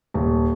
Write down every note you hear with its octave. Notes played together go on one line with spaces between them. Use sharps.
D#1